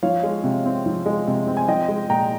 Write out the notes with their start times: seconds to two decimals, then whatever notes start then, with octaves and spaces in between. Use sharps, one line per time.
0.03 F3 C#5 F5
0.23 G#3
0.44 C3
0.65 C4
0.86 F3
1.06 G#3
1.27 C3
1.47 C4
1.57 G#5
1.68 F3 D#5 G5
1.88 G#3
2.10 A#2 G5 A#5